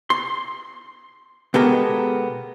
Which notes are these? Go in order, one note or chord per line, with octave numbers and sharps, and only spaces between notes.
C6
B2 G#3 B3 G4 A4 A#4